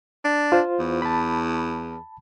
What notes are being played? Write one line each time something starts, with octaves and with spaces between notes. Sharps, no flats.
D4
F4 C5
E2
A5 B5